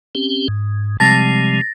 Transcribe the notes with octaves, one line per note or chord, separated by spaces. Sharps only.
C4 C#4 G4
G#2
C3 F3 G3 G#3 A5 A6 A#6